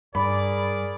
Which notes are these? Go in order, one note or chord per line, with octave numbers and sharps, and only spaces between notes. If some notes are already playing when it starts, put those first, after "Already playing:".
G2 G#4 A#4 D5 B5